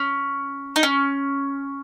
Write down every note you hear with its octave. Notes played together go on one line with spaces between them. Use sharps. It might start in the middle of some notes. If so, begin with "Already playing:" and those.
Already playing: C#4
D#4
C#4